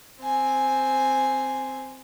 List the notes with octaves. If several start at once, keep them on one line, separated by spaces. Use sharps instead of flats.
C4 G#5